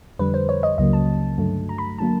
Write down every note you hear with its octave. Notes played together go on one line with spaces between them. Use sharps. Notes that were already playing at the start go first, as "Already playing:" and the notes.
F2 D3 G3 B4
C5
C#5
D#5
C#2 C#3 F#3 A#3 D#5
A5
G2 D3 F#3 A3
A#5
B5
D3 F#3 A#3 A5